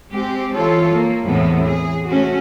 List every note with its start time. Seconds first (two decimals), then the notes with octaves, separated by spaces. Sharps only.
0.13 G#3 C4 G4
0.55 E3 F4 A4 C#5
0.95 A#3
1.25 E2 A2 C3 E3 B3
1.64 G#4
2.09 A3 C#4 F#4